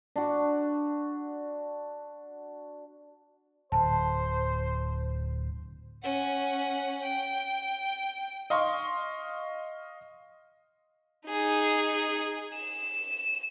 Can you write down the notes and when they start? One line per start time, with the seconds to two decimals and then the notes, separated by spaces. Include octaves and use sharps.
0.16 D4 F#4
3.72 D1 C5 A5
6.02 C#4 F#5
7.03 G5
8.50 D#5 F5 C6 C#6
11.28 D#4 G#4
12.55 E7